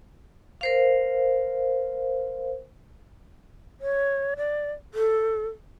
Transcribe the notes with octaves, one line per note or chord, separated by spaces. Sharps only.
A#4 C5 F5
C#5
D5
A4